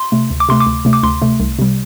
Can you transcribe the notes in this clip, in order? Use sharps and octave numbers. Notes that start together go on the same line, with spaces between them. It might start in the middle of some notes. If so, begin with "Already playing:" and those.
Already playing: C6
C3 A3
D2
D6
C3 A3 C6
D6
D2
C3 A3
D6
D2 C6
C3 A3
C2
C3 G3